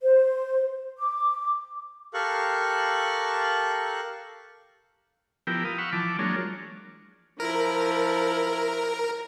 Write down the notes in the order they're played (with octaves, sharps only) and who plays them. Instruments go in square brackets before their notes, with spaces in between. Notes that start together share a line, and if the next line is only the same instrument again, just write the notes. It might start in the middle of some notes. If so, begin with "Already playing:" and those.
[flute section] C5
D6
[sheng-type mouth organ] G4 A4 A#4 F5 C#6 F#6
[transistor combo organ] F3 B3 E4 G4 A#4 G5
F5 G5 D#6
F5 F#5 B5 C#6 E6
E3 F3 A5 D6
F#3 G#3 A#3 D4 F4 C#5
[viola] F3 E4 [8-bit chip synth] A#4